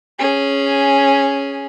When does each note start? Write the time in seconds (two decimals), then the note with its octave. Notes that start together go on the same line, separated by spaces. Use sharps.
0.19 C#4 G#4